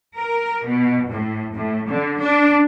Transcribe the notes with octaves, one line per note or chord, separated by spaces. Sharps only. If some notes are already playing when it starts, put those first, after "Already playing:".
A#4
B2
A2
A2
D3
D4